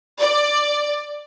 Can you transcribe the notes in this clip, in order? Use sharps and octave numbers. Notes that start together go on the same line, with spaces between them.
D5